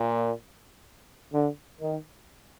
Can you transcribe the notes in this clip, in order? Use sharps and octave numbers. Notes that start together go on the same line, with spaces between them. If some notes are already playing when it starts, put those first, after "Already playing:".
Already playing: A#2
D3
D#3